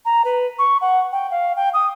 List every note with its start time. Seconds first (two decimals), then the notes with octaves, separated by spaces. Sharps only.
0.05 A#5
0.25 B4
0.59 C#6
0.81 F#5
1.12 G5
1.31 F5
1.56 G5
1.74 D#6